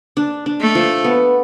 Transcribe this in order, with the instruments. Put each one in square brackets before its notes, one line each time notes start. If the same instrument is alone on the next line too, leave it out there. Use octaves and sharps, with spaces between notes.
[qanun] D4
D4
[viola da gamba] A3
[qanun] F3
B3